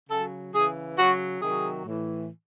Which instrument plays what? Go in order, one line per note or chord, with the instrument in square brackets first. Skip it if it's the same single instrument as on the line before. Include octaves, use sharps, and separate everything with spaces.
[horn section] C#3 F#3 A4
C#3 E3 G#4
C#3 F#3 F#4
C3 D#3 F#3 G#4
A2 E3